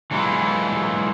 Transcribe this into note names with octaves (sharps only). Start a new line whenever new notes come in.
E3 F#3 G#3 E4 F4